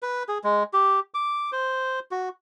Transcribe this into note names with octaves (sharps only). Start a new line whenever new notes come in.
B4
G#4
G#3
G4
D6
C5
F#4